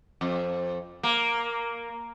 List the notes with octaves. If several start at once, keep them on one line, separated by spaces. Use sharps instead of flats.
F2
A#3